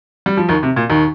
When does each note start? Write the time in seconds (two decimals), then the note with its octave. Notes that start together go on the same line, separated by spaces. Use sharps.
0.26 G3
0.37 F3
0.49 D#2 D#3
0.63 C3
0.76 A#2
0.90 D#2 D#3